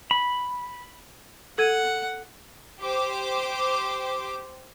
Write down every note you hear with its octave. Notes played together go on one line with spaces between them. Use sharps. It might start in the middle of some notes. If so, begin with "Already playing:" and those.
B5
A4 F#5 G#6 D#7
G4 C5 D6